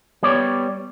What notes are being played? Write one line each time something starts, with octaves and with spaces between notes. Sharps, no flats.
G3 B3 C#5 D5